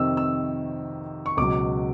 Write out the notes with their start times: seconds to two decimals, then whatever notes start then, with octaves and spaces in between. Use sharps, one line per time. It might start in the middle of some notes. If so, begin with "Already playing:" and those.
Already playing: F2 C3 D#3 E6
0.17 E6
1.26 C#6
1.37 C#2 B2 F#3 D6